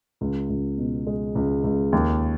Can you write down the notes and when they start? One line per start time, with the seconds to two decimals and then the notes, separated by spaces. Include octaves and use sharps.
0.21 C#2
0.50 C#2
0.78 B2
1.07 G#3
1.35 C#2
1.64 C#2
1.92 D#2